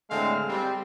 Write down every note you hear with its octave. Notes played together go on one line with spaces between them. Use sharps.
A2 D3 G#3 A3 C4 F5
G3 C4